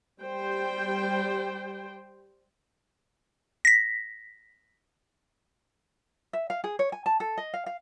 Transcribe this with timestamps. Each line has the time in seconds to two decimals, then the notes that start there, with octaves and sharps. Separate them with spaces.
0.22 G3 C5 G5
3.65 A#6 B6
6.33 E5
6.50 F5
6.64 G#4
6.79 C#5
6.92 G#5
7.06 A5
7.20 A4
7.38 D#5
7.54 F5
7.66 F5